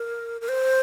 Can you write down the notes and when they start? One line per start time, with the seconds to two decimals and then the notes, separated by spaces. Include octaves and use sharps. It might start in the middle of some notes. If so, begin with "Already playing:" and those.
Already playing: A#4
0.41 A#4
0.49 C5